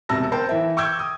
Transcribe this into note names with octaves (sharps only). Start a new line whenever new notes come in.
E1 C3 A5 E6 A#6
A#4 C5 G5 A5
E3 E5
G5 C#6 D6 E6 G6 G#6
D#6